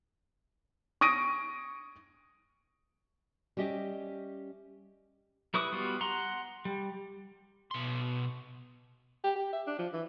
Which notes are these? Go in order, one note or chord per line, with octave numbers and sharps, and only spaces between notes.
C#6 D#6 A#6 D7 D#7
G3 C#4 G4 D#5 E5
G3 E4 B4 C#6 D#6
G3 B3 F4 F#4
F#5 A#5 C6
G3
B2 C6
G4
G4
E5
D4
F3
E3